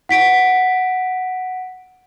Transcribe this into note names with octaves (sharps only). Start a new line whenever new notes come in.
F#5 B6 D7